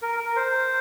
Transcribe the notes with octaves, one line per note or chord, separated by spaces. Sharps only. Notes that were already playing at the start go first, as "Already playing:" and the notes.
A#4
A#4
C5